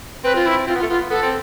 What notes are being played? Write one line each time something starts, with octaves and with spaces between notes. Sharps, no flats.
C4 B4
F4
E4
C4 F4
B3
F4
A3
B3 F4
B3 A4
C4